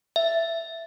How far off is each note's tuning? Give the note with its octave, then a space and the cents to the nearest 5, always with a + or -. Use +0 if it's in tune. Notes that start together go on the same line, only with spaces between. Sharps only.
E5 +10